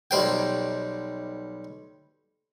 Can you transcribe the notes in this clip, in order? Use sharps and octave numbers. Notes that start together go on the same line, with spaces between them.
B1 G3 C5 G5